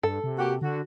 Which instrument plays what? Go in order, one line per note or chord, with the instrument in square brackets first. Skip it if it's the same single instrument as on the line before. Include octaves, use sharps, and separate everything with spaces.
[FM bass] G2 [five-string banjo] A4
[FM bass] C3
[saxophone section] A#3 F#4 G4
[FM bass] D3 [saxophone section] F#4